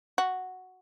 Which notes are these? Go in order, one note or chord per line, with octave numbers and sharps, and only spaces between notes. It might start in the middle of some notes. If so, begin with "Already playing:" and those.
F#4